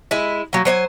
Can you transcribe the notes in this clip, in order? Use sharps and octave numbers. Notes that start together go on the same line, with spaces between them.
G#3 E4
F#3 A#3
F#3 C5 D#5 G#5